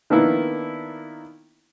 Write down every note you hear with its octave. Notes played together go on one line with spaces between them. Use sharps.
D#3 A#3 B3 D4 E4